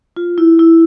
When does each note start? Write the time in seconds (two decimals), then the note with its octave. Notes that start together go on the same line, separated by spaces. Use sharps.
0.17 F4
0.38 E4
0.59 E4